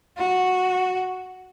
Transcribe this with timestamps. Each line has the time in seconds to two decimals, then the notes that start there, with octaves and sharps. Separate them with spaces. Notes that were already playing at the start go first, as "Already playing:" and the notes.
0.18 F#4